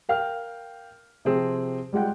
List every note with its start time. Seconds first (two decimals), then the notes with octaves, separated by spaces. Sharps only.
0.09 A#4 F5 G5 F6
1.25 C3 F3 C4 G#4
1.93 G3 G#3 F4 F#5 G5